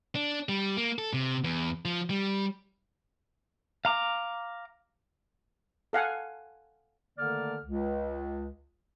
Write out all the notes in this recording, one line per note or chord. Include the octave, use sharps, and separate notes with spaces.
D4
G3
A#3
A4
C3
E2
F3
G3
F5 A#5 D6
A4 F5 F#5 G#5
D3 D#3 A3 A#3 D5 F6
C#2